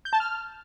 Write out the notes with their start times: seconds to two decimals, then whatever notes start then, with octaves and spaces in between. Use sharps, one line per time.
0.05 G6
0.13 A5
0.20 F6